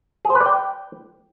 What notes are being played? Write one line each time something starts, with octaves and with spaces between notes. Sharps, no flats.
G#4
C5
B4
D5
G5